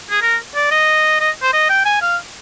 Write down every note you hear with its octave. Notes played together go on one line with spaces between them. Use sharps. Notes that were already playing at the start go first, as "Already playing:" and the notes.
G#4
A#4
D5
D#5
D#5
C5
D#5
G5
G#5
F5